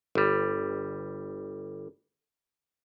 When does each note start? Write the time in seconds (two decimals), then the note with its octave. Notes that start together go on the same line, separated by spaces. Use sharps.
0.15 G1 G3